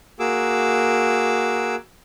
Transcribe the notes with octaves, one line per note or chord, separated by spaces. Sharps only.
A#3 F#4 G#4 D6 E6